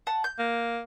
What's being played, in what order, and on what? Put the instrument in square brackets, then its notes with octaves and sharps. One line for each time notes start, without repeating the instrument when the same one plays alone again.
[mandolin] F#5 A5
G6
[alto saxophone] A#3